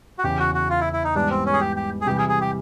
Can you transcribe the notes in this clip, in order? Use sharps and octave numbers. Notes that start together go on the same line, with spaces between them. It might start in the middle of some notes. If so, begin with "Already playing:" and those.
F#4
E2 C#3 E3 G4
F#4
F#4
F4
E4
E4
D#4
G#2 E3 G3 B3 D4
C4
C#4
G#4
G4
G4
G#4
C3 E3 G3 G4
G#4
G#4
G4